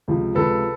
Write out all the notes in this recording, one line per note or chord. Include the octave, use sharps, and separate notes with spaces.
C#2 C3 F3
C#2 C3 F3 A4 B4